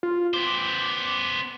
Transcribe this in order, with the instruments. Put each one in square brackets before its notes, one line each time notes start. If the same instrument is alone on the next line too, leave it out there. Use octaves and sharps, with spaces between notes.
[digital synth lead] F4
[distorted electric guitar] B3 C5 [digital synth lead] D6